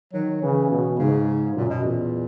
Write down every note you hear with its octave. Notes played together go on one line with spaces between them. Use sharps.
D#3 F#3
C#3 E3
B2
G#2 C#3
F#2 A#2
B2
E2 A#2